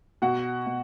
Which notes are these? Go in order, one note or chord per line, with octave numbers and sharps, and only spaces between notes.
B2 F#4 F#5
B2